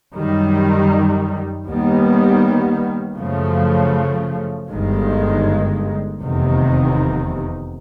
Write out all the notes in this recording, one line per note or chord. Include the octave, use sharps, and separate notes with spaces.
F#2 D#3 G3
D#2 D#3 G3 B3
F#2 C#3 F3 A3
G1 G2 D#3 G#3
F1 E2 C3 D#3